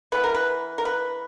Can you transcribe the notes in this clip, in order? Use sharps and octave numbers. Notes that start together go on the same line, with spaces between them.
E3 B3 B4
A#4
B4
A#4
B4